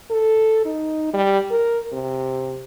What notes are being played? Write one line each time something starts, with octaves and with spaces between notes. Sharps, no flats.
A4
D#4
G3
A#4
C3